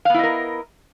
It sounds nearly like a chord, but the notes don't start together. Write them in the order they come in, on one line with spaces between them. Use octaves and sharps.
F5 B3 E4 D#5 A#4